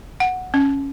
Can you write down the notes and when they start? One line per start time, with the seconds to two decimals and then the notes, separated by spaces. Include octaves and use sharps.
0.20 F#5
0.54 C#4